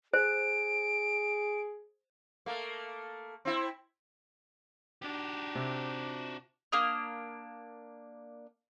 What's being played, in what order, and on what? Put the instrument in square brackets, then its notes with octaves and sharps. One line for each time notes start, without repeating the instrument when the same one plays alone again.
[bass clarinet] G#4 [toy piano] C5 [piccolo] D7
[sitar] A3 A#3
C4 E4
[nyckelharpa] D4 D#4 [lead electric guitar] F#4 G4
[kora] C3
[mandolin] A#3 D4 D#6 F6